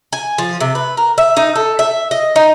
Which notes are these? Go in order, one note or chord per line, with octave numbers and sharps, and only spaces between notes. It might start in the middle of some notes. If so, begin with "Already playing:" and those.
G#5
F3
C3
B4
A#4
E5
D#4
A4
E5
D#5
D#4